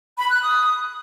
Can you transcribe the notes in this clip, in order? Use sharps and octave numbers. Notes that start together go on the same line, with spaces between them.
B5
F#6
D#6